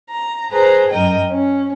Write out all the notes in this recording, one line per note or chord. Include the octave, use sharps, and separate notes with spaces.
A#5
G#4 B4 C5 A#5
F#2 A#4 D#5 G5
C#4